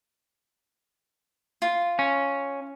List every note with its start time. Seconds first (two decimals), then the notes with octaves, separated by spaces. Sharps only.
1.62 F4
1.99 C#4